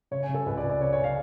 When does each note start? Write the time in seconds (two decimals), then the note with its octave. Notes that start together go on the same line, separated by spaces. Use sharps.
0.11 C#3 C#5
0.23 G#5
0.29 C#3
0.34 A4
0.46 C#2 B4
0.57 D5
0.63 C#2
0.70 D5
0.80 C#3 C#5
0.93 C#5
0.99 C#3
1.04 F5